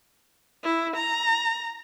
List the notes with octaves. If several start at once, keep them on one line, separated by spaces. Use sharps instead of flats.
E4
A#5